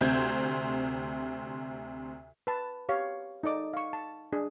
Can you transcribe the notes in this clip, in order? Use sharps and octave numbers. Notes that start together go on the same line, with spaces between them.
D2 C3 C4 G6 G#6
B4 A5
G4 C#5 F5
D#4 A4 D5 D6 D#6
F5 C#6
A5
D4 G#4